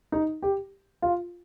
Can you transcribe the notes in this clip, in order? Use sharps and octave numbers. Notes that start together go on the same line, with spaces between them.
D#4
G4
F4